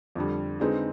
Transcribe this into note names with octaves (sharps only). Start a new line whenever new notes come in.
F2 D3 G3
D3 G#3 C4 D#4 B4